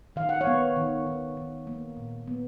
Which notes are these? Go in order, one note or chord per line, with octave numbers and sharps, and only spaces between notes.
D#3 F5
F#5
C#5 F5
B3
D#3
D#3
D#3
A#3
A#2
B3